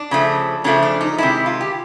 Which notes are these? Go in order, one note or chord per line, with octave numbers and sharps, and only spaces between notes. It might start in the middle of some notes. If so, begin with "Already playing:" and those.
Already playing: D4
C#3 F3 A3
C#3 F3 A3 D4
D4
D#4
C3 D#3 G#3 E4
F4
G4